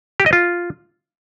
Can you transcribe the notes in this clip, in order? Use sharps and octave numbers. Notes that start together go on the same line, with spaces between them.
G4
D#5
F4